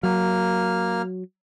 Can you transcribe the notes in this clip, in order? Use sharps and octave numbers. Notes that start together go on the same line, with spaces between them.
F#3 A#3 F6